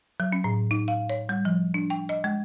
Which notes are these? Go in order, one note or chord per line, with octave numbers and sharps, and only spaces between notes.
F#3
C#4
A2
D#4
F5
C#5
G3
F3
D4
G5
D#5
G#3